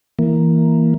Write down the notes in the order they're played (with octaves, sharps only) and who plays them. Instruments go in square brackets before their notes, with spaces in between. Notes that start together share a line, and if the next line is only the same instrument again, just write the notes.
[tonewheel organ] E3 A#3